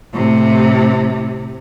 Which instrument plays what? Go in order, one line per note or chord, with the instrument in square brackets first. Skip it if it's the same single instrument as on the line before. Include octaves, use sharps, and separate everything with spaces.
[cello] A2 C3